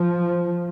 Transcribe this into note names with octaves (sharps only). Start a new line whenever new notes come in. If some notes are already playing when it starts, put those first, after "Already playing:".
Already playing: F3